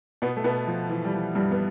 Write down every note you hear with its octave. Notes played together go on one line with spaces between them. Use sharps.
B2 B3
A3
B2 B3
F3
E3
G3
F3
G2 G3
B3